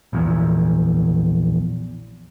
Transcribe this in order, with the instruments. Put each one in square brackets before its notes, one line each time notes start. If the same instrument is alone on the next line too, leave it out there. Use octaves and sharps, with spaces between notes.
[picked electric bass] A#1 E2